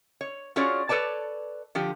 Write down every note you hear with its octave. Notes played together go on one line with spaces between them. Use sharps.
C#5
C#4 F4 F#4 G#4 C#5 D5
A4 B4 C#5 D5 A5
D3 F3 G4